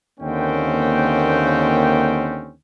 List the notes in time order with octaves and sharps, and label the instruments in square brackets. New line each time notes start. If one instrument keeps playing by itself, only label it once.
[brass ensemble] D#2 D3 A#3 C4 C#4 G5